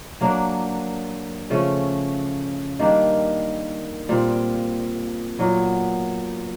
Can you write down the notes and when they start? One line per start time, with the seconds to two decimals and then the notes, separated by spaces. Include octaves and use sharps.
0.21 F#3 A#3 D4
1.50 C#3 F3 A3 C#4
2.79 D#3 G3 A#3 D4
4.09 A#2 G3 C4 F4
5.38 A#2 F#3 B3